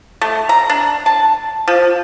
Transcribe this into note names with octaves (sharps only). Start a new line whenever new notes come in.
A3
A#5
D4
A5
F3